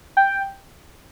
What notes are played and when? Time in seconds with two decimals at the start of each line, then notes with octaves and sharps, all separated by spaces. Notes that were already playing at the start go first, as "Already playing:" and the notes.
0.17 G5